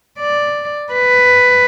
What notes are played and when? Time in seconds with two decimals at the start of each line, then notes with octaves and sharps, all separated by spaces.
0.19 D5
0.93 B4